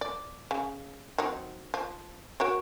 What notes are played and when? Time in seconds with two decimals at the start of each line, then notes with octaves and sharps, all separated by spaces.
0.01 D5
0.51 C#3
1.18 F#3 C4 D#4
1.74 F3
2.40 F#4 A#4 C#5